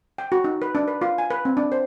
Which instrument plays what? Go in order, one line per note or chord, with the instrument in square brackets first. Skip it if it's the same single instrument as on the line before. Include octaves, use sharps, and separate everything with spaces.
[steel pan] G5
F#4
D#4
B4
D4
B4
F4
G#5
B4
C4
D4
C5